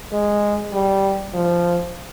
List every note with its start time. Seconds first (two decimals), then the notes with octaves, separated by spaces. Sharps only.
0.13 G#3
0.73 G3
1.34 F3